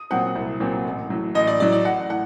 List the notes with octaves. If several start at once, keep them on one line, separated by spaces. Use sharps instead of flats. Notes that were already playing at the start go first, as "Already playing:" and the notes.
Already playing: D#6
A#2 F#3 C4 F#5
C2
A#2 F#3 C4
A1
A2 F#3
A1 D#5
D5
A2 F#3 D5
D5
A1 F#5
A2 F#5